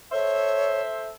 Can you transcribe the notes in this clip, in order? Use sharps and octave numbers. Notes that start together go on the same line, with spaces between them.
A4 C5 C#5 E5